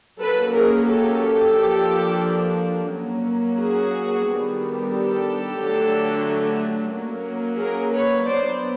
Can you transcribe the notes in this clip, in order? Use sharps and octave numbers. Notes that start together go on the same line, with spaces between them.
F#3 A#3 C#4 A4 B4
G#4 A#4
G4 A4
F3 A#3 D4
F#3 A#3 C#4
F#4 G#4
D#3 G3 B3 D4
G4 A4
D3 F#3 A3 D4
F#3 A#3 C#4
G#4 A#4
B4 C#5
F#3 B3 D4 C5 D5